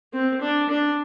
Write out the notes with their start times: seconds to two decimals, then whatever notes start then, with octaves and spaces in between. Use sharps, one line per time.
0.13 C4
0.42 D4
0.69 D4